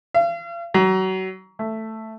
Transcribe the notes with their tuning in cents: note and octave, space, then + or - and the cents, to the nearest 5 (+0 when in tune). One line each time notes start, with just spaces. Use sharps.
F5 -40
F#3 +30
A3 +5